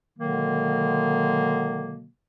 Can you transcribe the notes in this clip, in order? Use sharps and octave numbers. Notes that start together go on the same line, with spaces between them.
B2 D3 D#3 F#3 G#3 A#3